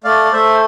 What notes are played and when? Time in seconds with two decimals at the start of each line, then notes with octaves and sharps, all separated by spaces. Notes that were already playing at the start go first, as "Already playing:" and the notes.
0.04 A3 D5 F5
0.25 D5
0.32 A3 C5 E5